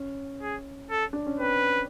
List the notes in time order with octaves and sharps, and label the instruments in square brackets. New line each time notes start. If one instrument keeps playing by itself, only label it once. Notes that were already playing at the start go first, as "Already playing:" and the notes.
Already playing: [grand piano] C#4
[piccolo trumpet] G#4
A4
[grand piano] D4
C#4
[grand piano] C4 [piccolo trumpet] B4